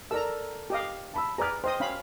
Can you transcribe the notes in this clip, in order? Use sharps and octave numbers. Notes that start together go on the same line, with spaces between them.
A4 A#4 D5 A#5 E6
G4 D#5 F5
A5 B5 E6
G#4 B4 D5 A#5 F6
C5 D#5 G5 D#6
C#4 F5 B5